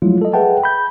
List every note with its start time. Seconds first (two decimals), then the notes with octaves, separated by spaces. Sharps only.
0.02 F3 F#3 G#3 A3 E4 F4
0.22 A4 D#5
0.33 G#4 B4 E5 F#5 G5 A5
0.63 B5 G6